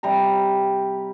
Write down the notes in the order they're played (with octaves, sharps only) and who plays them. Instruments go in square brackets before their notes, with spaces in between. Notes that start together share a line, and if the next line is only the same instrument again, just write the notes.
[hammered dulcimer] C3 G3 A#5